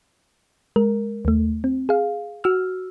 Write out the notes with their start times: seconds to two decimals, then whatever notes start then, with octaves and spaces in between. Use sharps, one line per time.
0.76 G#3 A#4
1.25 D#2 A3
1.64 C4
1.89 G#4 F5
2.44 F#4 E6 F6